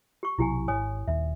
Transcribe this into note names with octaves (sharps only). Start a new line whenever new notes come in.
G4 C#6
B1 C3 F#3 E4 G4 G#5
G#1 C#5 G#5 D#6
D#1 D#2 E5